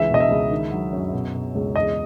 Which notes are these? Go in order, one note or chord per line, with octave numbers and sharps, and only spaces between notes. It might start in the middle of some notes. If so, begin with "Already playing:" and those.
Already playing: C#2 E3 E5
B2 D#5
E5
C#2
D#3
F#3
F#2
B2
B2
C#2
E2 D#5